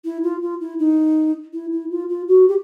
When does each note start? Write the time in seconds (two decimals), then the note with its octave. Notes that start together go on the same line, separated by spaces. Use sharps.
0.05 E4
0.23 F4
0.42 F4
0.60 E4
0.79 D#4
1.53 E4
1.72 E4
1.90 F4
2.09 F4
2.28 F#4
2.48 G4